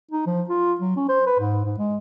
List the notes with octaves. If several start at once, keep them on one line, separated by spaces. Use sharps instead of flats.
D#4
F3
F4
F#3
C#4
C5
B4
G#2
G#2
G#3